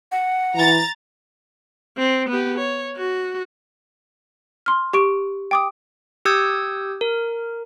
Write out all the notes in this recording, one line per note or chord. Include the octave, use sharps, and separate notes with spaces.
F#5
E3 A#5 A6
C4
B3 G4
C#5
F#4
C6 F6
G4 C#6 D7
G5 D6 D#6
G4 D#6 E6 G6 G#6
A#4